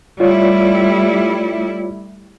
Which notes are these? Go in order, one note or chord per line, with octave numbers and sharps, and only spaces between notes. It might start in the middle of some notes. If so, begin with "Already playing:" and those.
G3 A3 E4 F4 C#5 D5